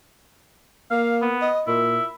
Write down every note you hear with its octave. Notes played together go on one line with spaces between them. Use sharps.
A#3 F5
B3
D#5
A#2 E4